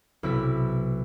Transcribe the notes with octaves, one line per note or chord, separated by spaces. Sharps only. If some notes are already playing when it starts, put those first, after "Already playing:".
B1 C3 E4 B4 B6